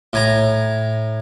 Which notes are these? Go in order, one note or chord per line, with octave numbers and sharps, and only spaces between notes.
A2 G#5 A#5